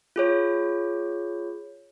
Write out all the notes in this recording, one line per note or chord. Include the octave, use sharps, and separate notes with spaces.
F4 G#4 C#5